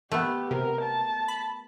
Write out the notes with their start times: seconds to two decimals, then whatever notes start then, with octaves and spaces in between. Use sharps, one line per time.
0.12 A3 B3 G4
0.51 C3 A#4
0.82 A5
1.28 B5